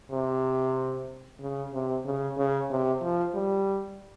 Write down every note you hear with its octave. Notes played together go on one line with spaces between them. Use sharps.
C3
C#3
C3
C#3
C#3
C3
F3
G3